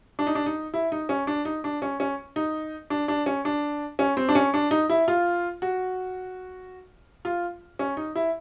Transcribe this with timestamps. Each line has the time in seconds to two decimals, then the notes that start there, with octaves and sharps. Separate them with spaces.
0.19 D4
0.27 D#4
0.35 D4
0.46 D#4
0.74 E4
0.92 D#4
1.09 C#4
1.27 D4
1.45 D#4
1.64 D4
1.82 C#4
2.00 C#4
2.36 D#4
2.90 D4
3.08 D4
3.26 C#4
3.45 D4
3.99 C#4
4.17 C4
4.29 D4
4.35 C#4
4.54 D4
4.71 D#4
4.90 E4
5.08 F4
5.62 F#4
7.25 F4
7.79 C#4
7.97 D#4
8.15 E4